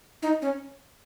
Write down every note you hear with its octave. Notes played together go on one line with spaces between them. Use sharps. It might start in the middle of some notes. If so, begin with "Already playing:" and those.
D#4
C#4